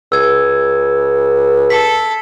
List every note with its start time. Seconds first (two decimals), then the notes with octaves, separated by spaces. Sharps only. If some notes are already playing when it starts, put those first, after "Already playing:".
0.12 C#2 E6 G#6
1.70 A4 B6